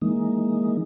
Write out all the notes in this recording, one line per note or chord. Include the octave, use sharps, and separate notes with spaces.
E3 G#3 A#3 D#4